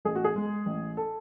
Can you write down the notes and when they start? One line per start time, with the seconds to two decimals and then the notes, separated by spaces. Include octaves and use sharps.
0.05 A1 G#4
0.15 F#4
0.24 G#4
0.36 G#3
0.66 A1
0.97 A4